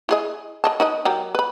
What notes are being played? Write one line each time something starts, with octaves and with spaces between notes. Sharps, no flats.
E4 G#4 D#5
A#4 D#5 A5
D#4 B4 D#5
F#3 G4 A#4
B4 B5